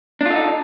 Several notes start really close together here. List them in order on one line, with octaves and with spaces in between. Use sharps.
D4 F4 A4 D#4